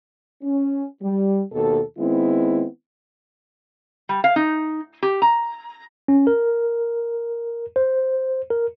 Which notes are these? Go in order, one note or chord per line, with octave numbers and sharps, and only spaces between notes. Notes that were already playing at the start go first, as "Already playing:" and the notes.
C#4
G3
D#2 B2 A4
D#3 G#3 B3 C4 E4
G3
F5
D#4
G4
A#5
C#4
A#4
C5
A#4